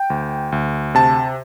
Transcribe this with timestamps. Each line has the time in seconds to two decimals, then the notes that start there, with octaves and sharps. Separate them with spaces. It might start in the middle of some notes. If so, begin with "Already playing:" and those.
Already playing: G5
0.10 D2
0.52 D2
0.95 C3 A5